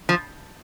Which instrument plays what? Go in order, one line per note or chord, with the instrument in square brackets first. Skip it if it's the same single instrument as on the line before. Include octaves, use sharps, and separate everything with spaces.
[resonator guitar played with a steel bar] F3